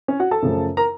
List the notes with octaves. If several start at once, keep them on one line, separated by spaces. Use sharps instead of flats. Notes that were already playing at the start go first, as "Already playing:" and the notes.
C#4 C#5
F#4 F#5
A4 A5
F#2 C#3 F3 A3
A#4 A#5